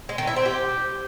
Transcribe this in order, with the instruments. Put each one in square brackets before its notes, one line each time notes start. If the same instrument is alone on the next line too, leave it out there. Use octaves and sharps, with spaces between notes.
[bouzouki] G#3
D#3
E4
C4
G4